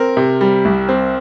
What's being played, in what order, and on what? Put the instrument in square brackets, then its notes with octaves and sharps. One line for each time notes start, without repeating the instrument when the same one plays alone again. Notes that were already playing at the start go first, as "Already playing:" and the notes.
Already playing: [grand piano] C4 [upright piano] A#4
[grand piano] C3
G3
C2
C4